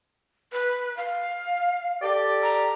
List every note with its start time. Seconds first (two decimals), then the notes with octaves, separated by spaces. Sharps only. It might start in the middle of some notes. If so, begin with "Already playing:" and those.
0.52 B4
0.97 F5
2.02 G4 A4 D5
2.42 A#5